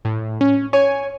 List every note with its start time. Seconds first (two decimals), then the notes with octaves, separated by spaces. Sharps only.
0.05 A2
0.41 C#4
0.73 C#5 G#5